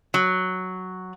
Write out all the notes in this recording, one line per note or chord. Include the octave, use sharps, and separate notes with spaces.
F#3